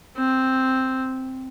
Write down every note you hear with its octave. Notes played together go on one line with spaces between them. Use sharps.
C4